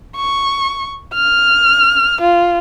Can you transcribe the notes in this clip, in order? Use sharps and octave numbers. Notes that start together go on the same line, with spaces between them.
C#6
F6
F4